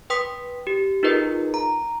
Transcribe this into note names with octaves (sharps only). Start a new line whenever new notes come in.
B4 G5 C6 D#6 B6
G4
D#4 F4 G#4 A#4 B4 D#5
A#5